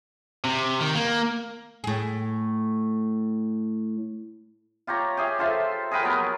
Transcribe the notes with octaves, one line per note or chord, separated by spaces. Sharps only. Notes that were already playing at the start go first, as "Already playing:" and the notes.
C3
D#3
A#3
A2 G#4
F4 G4 C#5 A#5
G4 G#4 E5
F4 A4 C5 E5
G#4 A#4 B4 G5
F#3 B3 A#4